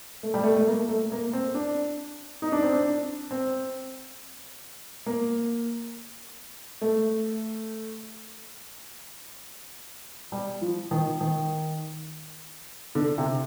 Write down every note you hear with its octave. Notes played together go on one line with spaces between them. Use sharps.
A3
G3
A3
A3
A#3
A3
A#3
C4
D4
D#4
D4
C4
D4
C4
A#3
A3
G3
F3
D#3
D#3
D3
C3